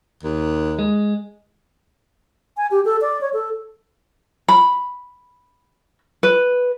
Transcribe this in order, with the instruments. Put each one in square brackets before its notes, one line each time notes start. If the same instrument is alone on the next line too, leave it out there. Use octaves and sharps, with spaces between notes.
[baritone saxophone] D#2
[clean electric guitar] G#3
[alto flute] G#5
G4
A4
D5
C#5
A4
[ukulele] B5
B4